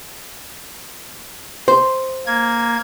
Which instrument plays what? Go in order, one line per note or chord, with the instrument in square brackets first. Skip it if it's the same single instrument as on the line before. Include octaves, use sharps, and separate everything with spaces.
[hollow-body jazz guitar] C5
[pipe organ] A#3 G#6